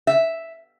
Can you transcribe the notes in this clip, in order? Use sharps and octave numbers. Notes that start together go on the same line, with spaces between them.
E5